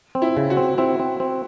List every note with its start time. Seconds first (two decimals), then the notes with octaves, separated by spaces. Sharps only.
0.15 C4
0.22 E4
0.37 C#3
0.50 F#4
0.57 C4
0.78 C4 E4
0.99 C4
1.20 C4